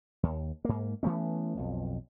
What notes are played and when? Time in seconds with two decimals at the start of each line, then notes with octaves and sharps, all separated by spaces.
0.23 D#2
0.65 G#2 A#3
1.03 E3 A3 B3 C#4
1.57 B1 F2